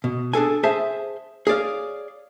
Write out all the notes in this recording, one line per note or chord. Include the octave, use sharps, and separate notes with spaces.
B2
D4 G#4 A4 G#5
G#4 C5 E5 A5
G#4 C#5 D5 F5